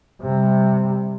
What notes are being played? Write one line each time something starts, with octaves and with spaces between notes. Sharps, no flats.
C3 G3